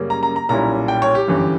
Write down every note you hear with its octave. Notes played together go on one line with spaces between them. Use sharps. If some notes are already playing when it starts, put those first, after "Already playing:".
Already playing: F#2 C#3 G3 A#3 C#4
A#5
A#5
A#5
B1 A#2 G3 C#4 E4 A#5
G5
C#5
G4
G1 F#2 E3